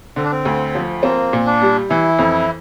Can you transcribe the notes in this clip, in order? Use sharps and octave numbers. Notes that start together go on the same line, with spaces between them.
D3 C4
D4
C4
D2
F3
A#3 C4
A#2
D4
G3
E3 E4
F2